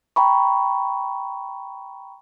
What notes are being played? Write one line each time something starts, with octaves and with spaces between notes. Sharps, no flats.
G5 A#5 B5 C#6